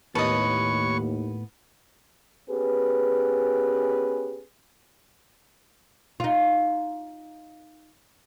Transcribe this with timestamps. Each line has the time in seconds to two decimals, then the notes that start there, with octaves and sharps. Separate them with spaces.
0.15 D#2 A2 B3 B4 C#5 D#5 A5 C#6
2.48 B3 C#4 G4 G#4 B4
6.20 D#4 F4